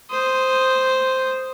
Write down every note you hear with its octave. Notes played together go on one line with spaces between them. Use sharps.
C5 D#6